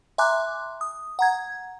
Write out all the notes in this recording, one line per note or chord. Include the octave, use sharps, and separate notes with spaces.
E5 G#5 A#5 C6 D6 F#6
D#6
F#5 A#5 G#6